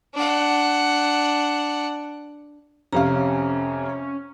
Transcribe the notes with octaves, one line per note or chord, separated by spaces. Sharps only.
D4 F#5
F2 C3 C#4 F5 A#5